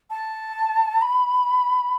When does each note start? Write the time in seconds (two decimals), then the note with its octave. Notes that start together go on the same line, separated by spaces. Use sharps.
0.10 A5
1.01 B5